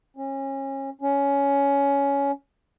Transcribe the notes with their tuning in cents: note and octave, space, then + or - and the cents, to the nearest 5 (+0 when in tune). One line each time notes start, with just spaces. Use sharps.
C#4 -30
C#4 +15